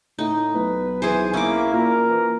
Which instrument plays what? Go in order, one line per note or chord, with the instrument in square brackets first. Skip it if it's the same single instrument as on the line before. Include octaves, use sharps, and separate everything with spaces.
[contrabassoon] A2 [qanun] D#4
[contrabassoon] B1 [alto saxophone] B4
[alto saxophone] E3 [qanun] G#4 C5 [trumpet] G#5
[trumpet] A#3 [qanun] C#4 D6 [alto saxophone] E4
[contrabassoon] A#2 [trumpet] A#4
[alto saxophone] E3